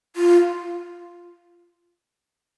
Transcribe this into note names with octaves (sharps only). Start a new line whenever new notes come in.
F4